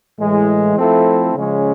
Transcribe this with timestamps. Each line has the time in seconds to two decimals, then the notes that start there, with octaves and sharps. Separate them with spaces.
0.20 A2 E3 G#3
0.77 F3 A3 C4 E4 A4
1.35 C#3 F3 G#3 C#4